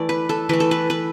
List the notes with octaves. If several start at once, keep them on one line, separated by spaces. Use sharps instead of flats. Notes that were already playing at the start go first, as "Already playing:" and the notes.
Already playing: E3 A3 D5
B4
A4
E3 A3 B4
A4
B4
B4